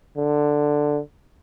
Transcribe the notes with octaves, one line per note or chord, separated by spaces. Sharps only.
D3